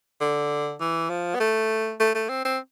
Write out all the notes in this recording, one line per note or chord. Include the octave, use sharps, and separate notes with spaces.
D3
E3
F3
B3
A3
A3
A3
C4
C4